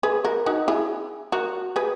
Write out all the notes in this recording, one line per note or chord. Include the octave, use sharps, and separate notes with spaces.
G#4 B4
F#4 A#4
D#4 F#4
E4 G#4
F#4 A#4
G#4 B4